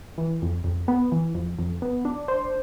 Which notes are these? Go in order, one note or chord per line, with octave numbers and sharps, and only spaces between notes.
E3
F2
F2
B3
E3
F2
F2
B3
D4
C5